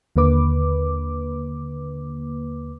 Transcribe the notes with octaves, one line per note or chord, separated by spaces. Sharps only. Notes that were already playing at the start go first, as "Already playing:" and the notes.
D#2 D3 A#3 B4 D6